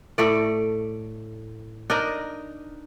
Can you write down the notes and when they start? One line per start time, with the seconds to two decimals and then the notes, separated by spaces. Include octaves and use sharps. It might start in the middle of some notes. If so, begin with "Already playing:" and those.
0.18 A2 A3 D5
1.90 D4 D#4 A#4 D#5